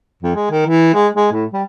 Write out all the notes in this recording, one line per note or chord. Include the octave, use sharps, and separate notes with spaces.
F2
G#3
D#3
E3
G#3
G#3
A2
G3